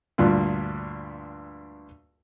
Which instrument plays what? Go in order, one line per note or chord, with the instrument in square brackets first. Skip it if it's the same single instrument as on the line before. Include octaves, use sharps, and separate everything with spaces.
[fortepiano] D2 G2 A#2